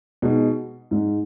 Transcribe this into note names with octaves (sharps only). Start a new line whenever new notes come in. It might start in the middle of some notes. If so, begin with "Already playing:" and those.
B2 G#3 D#4
G#2 G#3 D#4